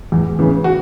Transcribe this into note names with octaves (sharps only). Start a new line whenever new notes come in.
E2
C#3 E3
F#4